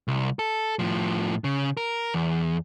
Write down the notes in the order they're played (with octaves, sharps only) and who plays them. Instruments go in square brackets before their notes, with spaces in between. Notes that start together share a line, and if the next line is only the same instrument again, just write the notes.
[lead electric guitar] C2
A4
A2 F3
C#3
A#4
E2